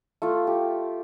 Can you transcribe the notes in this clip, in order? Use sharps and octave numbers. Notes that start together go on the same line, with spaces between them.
A3 F4
G4